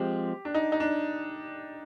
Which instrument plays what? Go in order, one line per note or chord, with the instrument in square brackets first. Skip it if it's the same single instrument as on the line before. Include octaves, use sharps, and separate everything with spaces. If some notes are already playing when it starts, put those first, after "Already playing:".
Already playing: [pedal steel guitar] F3 G#3 C4 [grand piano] G4
[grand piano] D4
D#4
D#4
D4